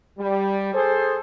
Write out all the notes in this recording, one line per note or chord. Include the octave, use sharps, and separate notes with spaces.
G3
G#4 A4 C5